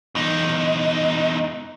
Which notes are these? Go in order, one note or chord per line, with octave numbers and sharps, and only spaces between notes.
E2 D#4